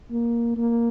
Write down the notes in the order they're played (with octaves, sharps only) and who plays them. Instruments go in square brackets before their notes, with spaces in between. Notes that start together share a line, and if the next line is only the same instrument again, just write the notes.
[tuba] A#3
A#3